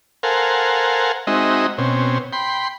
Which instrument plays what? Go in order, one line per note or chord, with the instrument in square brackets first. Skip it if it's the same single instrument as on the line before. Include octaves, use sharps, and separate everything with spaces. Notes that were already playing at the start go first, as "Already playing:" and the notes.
[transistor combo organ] A4 A#4 C5 F5 F#5 G#5
G#3 C4 D#4 F#4 D#5 E5
B2 C4 C#4
G5 B5 C6